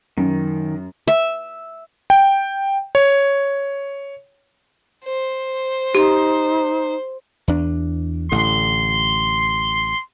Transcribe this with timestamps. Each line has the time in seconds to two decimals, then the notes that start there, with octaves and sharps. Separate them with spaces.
0.18 F#2 D#3
1.08 E5
2.10 G5
2.95 C#5
5.05 C5
5.95 D#4 G4 C6
7.48 E2 D4
8.32 A1 A2 D3 C6